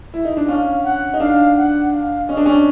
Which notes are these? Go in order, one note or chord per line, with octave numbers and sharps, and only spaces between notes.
E4
D#4
D4
C#4 F5
F#5
D#4
D4 F5
F#5
F5
C#4 D#5
D4
C#4